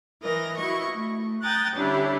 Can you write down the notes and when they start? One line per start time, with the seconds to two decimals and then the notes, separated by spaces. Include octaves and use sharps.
0.22 E3 A#4 D#5 A#6
0.57 E4 F#4 D#5 C#6
0.91 A3
1.42 G5 A#5 D#6 F#6 A6
1.75 D3 G3 C#4 D4 E4 G4